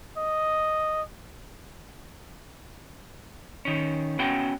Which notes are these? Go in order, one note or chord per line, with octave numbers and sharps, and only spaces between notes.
D#5
D#3 C#4
B3 C#4 F#4 F#5 G5